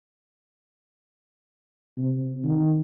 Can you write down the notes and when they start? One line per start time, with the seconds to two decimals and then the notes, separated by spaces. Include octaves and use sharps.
1.97 C3
2.44 D#3